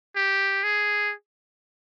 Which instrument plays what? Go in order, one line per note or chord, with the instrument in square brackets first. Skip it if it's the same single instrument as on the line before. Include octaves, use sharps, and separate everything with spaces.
[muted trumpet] G4
G#4